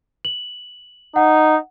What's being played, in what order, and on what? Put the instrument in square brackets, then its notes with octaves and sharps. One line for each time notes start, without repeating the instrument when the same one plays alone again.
[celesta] F#7
[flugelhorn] D#4 [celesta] F#5